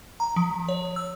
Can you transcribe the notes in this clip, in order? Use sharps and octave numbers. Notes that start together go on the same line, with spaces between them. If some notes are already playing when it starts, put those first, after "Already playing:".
A#5
F3
C#5
E6